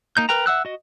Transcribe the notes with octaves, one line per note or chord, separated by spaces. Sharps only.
A#3 D#4 G6
A#4 B4 G5 A#5
E5 F#5 E6 F#6
F#4 D#5